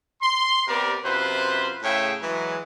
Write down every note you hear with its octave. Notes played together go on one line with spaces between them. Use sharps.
C6
C3 B3 G4 A#4 D5
F#2 C3 F4 B4 C5
A2 C#3 G#4 C#5 E5 G5
E3 F#3 G#3